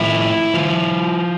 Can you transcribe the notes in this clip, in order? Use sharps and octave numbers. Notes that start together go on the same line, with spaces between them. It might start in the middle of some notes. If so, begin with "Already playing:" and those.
Already playing: A2 F3 E4
F3